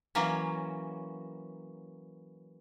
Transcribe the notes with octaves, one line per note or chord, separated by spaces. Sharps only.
E3 F#3 A#3 C#4